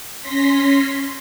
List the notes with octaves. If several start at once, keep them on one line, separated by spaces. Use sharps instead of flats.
C#4 C6 A#6 B6